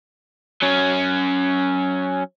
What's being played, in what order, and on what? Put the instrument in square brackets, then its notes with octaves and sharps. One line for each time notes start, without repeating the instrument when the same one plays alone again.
[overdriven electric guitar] F#3 C#4